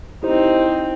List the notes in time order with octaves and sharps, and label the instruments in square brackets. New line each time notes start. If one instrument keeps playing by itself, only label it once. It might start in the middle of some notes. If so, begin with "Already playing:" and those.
[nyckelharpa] C4 D#4 [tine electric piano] E4 G4 C5